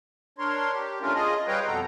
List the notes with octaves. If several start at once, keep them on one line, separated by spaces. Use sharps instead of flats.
D4 A#4 C#5 C6
G4
A3 C#4 D4 F4 A#4
F4 G#4 D#5
G3 B4 C#5 D#5 F5 G5
F2 B2 B3 A4 A#5